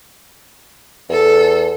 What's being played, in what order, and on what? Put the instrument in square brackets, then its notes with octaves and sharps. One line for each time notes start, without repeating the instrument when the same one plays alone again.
[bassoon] E2 [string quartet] A4